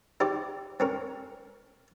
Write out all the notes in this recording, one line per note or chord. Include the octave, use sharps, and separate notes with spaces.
D#4 G4 C5 D5
C4 C#4 A#4